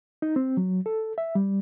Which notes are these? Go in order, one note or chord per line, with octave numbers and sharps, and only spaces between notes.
D#4
C4
F#3
A4
E5
G3